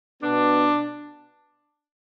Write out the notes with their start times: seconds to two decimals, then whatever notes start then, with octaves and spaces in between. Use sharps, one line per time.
0.22 B2 B3 D4